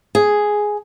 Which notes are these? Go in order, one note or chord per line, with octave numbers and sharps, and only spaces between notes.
G#4